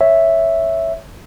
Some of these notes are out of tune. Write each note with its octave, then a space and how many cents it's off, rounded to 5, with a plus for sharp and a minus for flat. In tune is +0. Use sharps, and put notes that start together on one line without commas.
C#5 -5 E5 +0